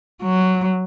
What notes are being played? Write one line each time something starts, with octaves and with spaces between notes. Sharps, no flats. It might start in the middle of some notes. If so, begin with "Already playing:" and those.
F#3